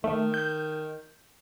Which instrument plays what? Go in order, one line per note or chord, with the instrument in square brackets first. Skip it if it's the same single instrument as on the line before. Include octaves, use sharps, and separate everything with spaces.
[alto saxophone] D#3 [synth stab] A3
[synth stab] G6